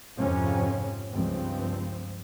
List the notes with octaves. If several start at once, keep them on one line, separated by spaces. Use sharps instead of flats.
F2 G#2 C3 F3 C4 C#4
C#2 G2 F3 C4